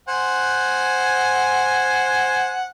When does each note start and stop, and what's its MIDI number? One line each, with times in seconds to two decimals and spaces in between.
0.08 2.68 72
0.08 2.68 78
0.08 2.68 80